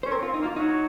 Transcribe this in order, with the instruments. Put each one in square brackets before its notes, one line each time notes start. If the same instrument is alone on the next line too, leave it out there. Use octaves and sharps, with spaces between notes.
[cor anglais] C#4 [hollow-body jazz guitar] C5
[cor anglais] C4 [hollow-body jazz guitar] A#4
[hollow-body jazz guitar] F4
[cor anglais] C4
[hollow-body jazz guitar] D#4
[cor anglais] A#3
[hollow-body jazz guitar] F4
[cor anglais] F#3 [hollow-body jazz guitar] D#4